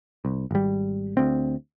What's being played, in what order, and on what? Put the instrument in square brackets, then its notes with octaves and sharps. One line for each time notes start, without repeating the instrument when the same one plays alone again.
[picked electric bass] C2
G#1 G3
D2 C4